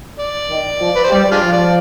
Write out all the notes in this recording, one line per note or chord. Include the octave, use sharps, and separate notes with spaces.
D5
D#3
F3
B4
C5
G3 D5
G#3 D4 F4
F3
D5